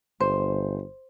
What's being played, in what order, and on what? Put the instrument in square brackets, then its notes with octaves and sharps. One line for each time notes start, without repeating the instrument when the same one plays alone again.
[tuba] G1 [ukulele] C5